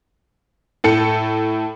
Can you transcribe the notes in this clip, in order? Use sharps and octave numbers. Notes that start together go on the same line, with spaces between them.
A2 A4 C#7